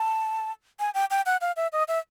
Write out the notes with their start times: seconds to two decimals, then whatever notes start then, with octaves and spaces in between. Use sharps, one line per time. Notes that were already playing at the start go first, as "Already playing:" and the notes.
Already playing: A5
0.80 G#5
0.94 G5
1.11 G5
1.26 F#5
1.41 F5
1.57 E5
1.73 D#5
1.88 E5